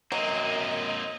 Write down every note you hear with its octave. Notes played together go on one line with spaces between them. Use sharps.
F#2 F#3 A#3 C4 D#5